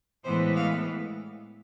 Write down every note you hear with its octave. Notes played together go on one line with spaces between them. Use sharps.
A2 E3 G#3 B3 C5
F5